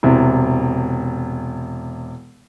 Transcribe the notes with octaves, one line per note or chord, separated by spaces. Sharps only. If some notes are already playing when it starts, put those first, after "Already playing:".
E1 C3 E4